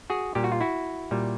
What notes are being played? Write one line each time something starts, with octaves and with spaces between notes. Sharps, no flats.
F#4 G#4
A#2 G3 G4
F#4
F4
E4 F#4
A#2 G3